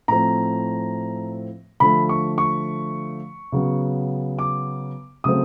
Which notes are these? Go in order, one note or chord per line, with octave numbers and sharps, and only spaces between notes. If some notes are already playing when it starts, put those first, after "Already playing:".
A2 F3 A3 C4 A#5
D3 F3 A3 B5
C#6
C#6
C#3 F#3 B3
D6
C#3 F#3 A3 C4 D#6